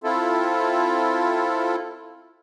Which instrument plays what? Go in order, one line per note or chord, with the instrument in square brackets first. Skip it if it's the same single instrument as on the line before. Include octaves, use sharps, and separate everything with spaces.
[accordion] C4 E4 F4 A4